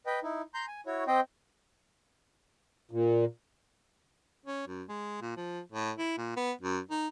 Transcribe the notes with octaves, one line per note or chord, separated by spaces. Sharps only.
B4 D#5 G5
D#4 E4
A#5 C6 G6
G#5
E4 F#4 C#5
C4 C5 D#5 G5
A#2
C#4
F#2
G#3
A#2
F3
A2
E4
A#2
B3
F#2
D#4